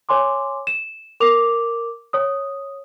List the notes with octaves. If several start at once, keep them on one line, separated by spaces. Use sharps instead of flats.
C#5 G#5 C6 D6
E7
A#4 D6 F7
C#5 D#6